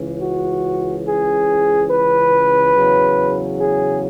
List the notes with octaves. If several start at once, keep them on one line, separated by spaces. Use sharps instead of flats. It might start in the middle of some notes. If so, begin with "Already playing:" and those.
Already playing: C#2 C#3 E3
F#4
G#4
B4
E2 C#3 F#3
G#4